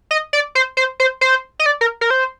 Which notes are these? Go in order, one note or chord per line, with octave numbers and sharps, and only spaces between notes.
D#5
D5
C5
C5
C5
C5
D#5
D5
A#4
A#4
C5